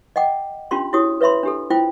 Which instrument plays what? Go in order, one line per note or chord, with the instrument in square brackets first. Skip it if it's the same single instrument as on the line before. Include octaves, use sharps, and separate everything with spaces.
[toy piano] D#5 F#5 G5 D6
C#4 D4 F4 G4 B5 C6
E4 F#4 G4 C#5 D#6
B4 C#5 E5 B5 C6
D4 G4 A4
E4 F4 C5 G5